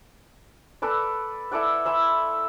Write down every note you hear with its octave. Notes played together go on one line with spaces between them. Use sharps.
A4 B4 D5
E4 A4 D5 F#5
E5 B5 C6